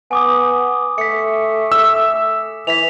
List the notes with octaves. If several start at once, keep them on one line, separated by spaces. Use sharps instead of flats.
B3 G#5 D6 D#6
A3 B6 C#7
E6
E3 B6 F7